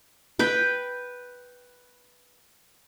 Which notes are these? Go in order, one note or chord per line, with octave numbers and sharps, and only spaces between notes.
B4 G5